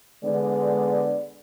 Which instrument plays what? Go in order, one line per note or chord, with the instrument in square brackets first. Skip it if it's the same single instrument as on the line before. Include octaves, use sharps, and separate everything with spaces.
[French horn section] D3 G#3 B3 D5